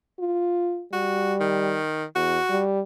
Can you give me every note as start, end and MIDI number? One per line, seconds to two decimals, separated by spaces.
0.19 0.84 65
0.93 1.78 55
0.93 1.34 66
1.40 2.04 51
2.15 2.38 40
2.15 2.61 66
2.50 2.81 55